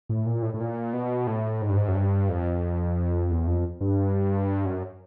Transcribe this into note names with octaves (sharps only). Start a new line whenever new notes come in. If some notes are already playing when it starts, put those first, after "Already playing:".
A2
A#2
A2
A2
A#2
B2
A2
G#2
G2
G#2
F#2
G2
F2
E2
F2
G2
F#2